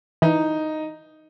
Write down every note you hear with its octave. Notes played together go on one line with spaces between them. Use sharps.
E3 D#4